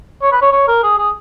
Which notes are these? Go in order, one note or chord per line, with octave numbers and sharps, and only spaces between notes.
C#5
B4
C#5
C#5
A#4
G#4
G#4